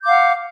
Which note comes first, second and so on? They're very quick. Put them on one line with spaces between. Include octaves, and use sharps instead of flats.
G6 D6 F5 F#5